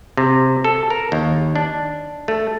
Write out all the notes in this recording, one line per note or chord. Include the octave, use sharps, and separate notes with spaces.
C3
A4
A#4
D#2
D4
A3